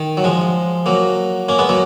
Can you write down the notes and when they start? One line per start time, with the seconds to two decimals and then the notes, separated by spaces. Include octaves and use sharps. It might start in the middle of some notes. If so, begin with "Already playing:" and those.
Already playing: D#3
0.17 F#3
0.24 F3 G#3
0.86 F#3 A#3
1.49 A#3 C#4
1.59 G#3 B3
1.69 F#3 A#3